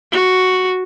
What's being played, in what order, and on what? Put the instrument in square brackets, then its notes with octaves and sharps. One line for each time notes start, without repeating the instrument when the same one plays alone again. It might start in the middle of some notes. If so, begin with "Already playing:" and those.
[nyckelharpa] F#4